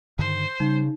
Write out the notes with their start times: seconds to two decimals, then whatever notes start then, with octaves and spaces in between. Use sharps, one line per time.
0.19 G2 D3 D#3 C5
0.60 C#3 G3 D#4